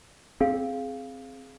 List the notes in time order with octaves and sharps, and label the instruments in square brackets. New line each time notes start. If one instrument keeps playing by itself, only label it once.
[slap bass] C4 [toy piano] G#4 F5